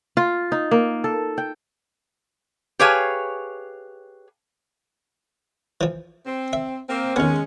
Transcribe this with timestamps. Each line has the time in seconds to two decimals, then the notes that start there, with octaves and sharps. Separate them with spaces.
0.17 F4
0.52 D#4
0.71 A#3
1.04 A4
1.38 G5
2.79 G4 G#4 B4 C#5 F5 G#5
5.81 E3 F3
6.26 C4
6.53 E5
6.89 A#3 C4
7.16 D#2 G#3 B3 C#4